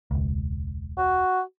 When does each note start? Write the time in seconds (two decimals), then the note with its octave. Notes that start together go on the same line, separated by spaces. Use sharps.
0.11 E1 C#2
0.98 F#4